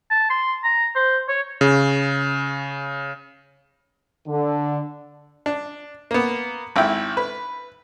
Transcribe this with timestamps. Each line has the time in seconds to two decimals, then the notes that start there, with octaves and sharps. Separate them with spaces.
0.10 A5
0.30 C6
0.64 A#5
0.95 C5
1.28 C#5
1.61 C#3
4.28 D3
5.46 D4
6.11 A#3 B3
6.76 G#1 E4 G5
7.17 B4